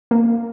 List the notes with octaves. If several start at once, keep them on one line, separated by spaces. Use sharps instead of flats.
A#3